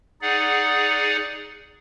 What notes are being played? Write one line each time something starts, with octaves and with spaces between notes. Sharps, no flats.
D#4 G#4 D5 F#5